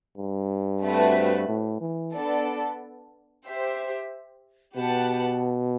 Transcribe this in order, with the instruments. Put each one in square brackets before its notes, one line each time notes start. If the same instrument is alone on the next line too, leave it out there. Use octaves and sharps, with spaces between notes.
[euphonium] G2
[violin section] A3 C4 F#4 B4 E5
[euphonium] A2
E3
[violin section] B3 D4 A4 D5
G4 C5 E5
[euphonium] B2 [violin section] G4 B4 F#5 A5